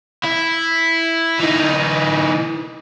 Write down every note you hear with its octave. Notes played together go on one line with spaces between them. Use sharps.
E4
E3 D#4